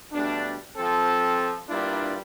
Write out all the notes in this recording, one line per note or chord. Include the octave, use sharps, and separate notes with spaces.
B2 G3 A3 D4
F3 C4 A4
G2 G3 A#3 D4 E4 F4